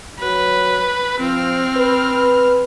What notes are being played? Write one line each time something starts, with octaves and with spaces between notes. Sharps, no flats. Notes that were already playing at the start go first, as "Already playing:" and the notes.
F#3 B4
F3 C4 F6
B4